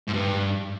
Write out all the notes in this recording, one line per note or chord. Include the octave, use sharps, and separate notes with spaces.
G#2
G2